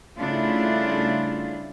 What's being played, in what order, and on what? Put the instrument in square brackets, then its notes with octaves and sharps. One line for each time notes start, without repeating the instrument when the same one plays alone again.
[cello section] C#3 G3 A3 D4 E4 F4